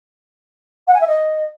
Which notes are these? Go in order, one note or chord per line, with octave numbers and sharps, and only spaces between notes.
F#5
G#5
E5
D#5